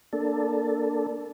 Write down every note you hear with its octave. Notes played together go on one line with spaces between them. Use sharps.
A#3 D4 A4